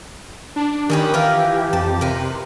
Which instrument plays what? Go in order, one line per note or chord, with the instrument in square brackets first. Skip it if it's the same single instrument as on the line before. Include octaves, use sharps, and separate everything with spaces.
[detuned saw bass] D4
[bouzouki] A#2 C#4 B4 [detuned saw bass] D#3 [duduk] G4
[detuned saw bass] E3 [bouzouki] F4 A#4 F5
[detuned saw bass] F2 [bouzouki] A5
[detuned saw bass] C3 [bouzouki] A#4 B4